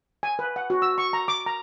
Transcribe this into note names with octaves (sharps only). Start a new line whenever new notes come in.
G#5
B4
F#5
F#4
E6
C#6
A#5
D6
A#5